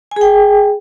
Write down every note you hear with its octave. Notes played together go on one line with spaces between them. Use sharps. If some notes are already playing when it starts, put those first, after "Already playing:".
G#4 G5 G#5